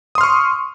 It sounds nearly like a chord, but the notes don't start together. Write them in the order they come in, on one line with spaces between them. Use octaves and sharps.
D#6 C6 F6 C#6